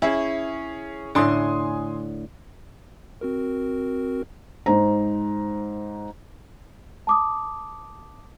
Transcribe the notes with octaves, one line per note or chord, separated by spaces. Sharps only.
C#4 E4 G#4
A2 D3 G#5 C6 D#6
C4 F#4 A#4
G#2 C5 A#5
A5 D6 D#6